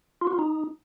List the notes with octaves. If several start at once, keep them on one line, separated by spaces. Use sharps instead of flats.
F4
F#4
F4
D#4